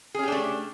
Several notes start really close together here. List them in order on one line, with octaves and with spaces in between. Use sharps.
G#4 C#4 G4 D4 A3